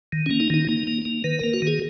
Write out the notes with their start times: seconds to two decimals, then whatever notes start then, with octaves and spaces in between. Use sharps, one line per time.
0.12 D#3
0.26 A#3 C#4
0.40 D#4
0.50 D#3 D#4
0.69 A#3 D#4
0.87 A#3
1.05 A#3
1.24 D#3 B4
1.39 A#3 A#4
1.54 F#4
1.62 D#3 G#4